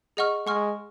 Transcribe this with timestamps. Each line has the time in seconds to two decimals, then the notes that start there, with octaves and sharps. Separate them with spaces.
0.17 G#4 D#5 F#5 C#6 F6
0.46 G#3 F#5 C#6 F6